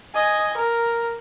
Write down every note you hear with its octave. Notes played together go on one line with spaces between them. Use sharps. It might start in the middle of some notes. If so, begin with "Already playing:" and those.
D#5 G#5
A#4